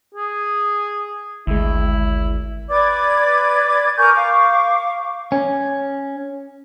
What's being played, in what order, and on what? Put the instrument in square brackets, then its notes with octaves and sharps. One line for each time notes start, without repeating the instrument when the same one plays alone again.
[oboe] G#4
[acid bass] G#1 [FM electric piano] D2 G#3 [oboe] E4
[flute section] B4 D5 D6 G#6
A#4 G#5 C#6 G6
F5 C#6 D6
[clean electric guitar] C#4